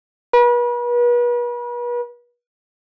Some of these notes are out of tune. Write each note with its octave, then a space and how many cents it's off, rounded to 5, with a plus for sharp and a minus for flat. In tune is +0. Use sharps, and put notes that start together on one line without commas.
B4 -40